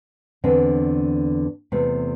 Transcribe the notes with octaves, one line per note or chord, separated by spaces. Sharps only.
E2 D3 C4
E2 C3 A3